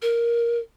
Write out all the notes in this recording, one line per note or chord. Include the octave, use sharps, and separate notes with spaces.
A#4